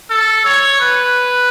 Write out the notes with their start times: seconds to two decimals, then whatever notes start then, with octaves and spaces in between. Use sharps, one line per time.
0.10 A4
0.45 C#5
0.80 B4